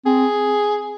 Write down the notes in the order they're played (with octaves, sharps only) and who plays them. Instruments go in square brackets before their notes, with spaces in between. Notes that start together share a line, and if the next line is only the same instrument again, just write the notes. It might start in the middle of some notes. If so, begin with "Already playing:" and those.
[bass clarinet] C4 [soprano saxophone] G#4